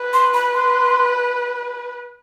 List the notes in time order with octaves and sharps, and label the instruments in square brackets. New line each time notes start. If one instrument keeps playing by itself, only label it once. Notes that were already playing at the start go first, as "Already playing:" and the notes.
Already playing: [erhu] B4
[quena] C6
B5
C6